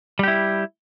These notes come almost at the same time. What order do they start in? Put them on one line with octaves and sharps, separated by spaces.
G3 G4 E4